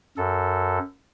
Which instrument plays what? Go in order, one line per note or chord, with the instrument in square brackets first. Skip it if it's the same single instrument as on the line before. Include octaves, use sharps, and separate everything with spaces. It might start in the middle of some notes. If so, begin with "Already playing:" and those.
[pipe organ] F#2 A4